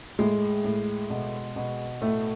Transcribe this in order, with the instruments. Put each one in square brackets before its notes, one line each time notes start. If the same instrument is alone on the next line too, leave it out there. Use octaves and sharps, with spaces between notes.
[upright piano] A2 G#3
A2
B2
B2
A2 A3